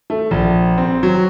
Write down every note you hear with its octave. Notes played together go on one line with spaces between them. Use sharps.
A3
A#1
C4
F#3